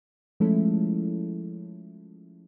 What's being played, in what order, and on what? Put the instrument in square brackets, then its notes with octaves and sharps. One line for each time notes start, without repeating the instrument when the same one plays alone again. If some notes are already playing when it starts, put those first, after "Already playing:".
[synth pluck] F3 G#3 A3 C#4 E4 A4